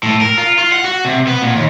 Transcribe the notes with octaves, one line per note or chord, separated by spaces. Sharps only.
A2
A#4
F4
F4
F#5
F#4
C3
B3
A#2
D#2